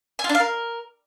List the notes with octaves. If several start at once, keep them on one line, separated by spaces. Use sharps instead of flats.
G#5
F4
D4
F5
A#4